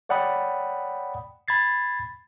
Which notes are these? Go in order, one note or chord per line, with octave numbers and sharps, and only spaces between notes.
C#5 D5 F#5 G5 B5 D#6
B5 G#6 A6 C7